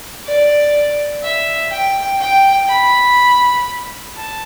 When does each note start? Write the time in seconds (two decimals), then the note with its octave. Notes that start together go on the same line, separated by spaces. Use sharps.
0.24 D5
1.23 E5
1.71 G5
2.20 G5
2.69 B5
4.15 A5